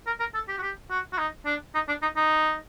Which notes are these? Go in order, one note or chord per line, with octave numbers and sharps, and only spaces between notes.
A#4
A#4
A4
G4
F#4
G4
F#4
F#4
D#4
D4
D#4
D4
D#4
D#4